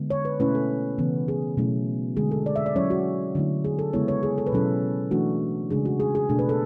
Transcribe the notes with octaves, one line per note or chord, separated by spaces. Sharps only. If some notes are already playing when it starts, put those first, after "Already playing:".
Already playing: D3 G#3 B3
C#5
B4
B2 A3 C#4 E4 B4
A4
C#3 E3 B3
G#4
B2 F#3 A3 C#4 E4
D3 G#3 D4 G#4
A4
D5
E5
D5
F#3 C#4 E4 C#5
F#4
D3 F#3 A3 E4
G#4
A4
C#3 G#3 B3 E4 C#5
C#5
G#4
A4
B4
B2 F#3 C#4 E4 A4
E3 A3 D4 F#4
C#3 G#3 D4 G#4
F#4
G#4
G#4
B2 A3 D4 A4
B4
A4